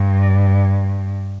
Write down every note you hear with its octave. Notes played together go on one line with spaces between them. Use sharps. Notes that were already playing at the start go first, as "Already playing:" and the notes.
Already playing: G2